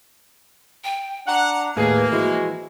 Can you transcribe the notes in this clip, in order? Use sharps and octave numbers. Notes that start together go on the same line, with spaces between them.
G5
D4 F#5 A#5
D#2 A2 A#3 G#4 B4
E3 F3 G#3 E4 F#4